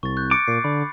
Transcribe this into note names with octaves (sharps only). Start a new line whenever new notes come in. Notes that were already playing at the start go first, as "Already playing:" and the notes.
C2 C#6 A6
C#6 F#6 G6
D6 A6 C#7 D7
A#2 A6 C7
D3 B5